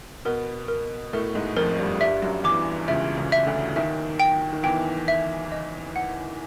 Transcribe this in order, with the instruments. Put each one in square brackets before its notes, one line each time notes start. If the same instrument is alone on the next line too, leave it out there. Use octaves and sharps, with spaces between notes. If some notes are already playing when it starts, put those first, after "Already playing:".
[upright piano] B2 B3 [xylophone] A#4
[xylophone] A#4
[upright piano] A2 A3 [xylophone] A#4
[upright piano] G#2 G#3
[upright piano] F2 F3 [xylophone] A#4
[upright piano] G2 G3
[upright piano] G2 G3 [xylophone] E5
[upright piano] F#2 F#3
[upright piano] E2 E3 [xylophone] D6
[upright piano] C#2 C#3 [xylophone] E5
[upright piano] C#2 C#3
[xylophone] E5
[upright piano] D2 D3
[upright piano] D#2 D#3 [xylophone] E5
[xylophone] G5
[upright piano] D#3
[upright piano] E2 E3 [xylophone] G5
[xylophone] E5
D#5
F#5